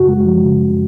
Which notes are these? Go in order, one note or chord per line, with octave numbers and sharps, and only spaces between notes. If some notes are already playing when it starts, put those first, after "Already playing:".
Already playing: F#2 C#3 F#4
G#3
F3
C#3
F#2